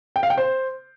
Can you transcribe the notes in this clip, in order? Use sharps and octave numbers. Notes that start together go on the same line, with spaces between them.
G5
F5
G5
C5